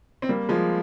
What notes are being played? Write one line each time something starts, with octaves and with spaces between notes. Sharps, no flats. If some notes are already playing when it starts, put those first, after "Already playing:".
C4
G3 A#3
F3 G#3